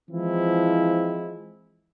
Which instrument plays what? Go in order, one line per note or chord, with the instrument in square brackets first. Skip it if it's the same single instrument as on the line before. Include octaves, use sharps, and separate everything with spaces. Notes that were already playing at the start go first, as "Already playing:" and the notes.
[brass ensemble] E3 F3 G#3 C4 E4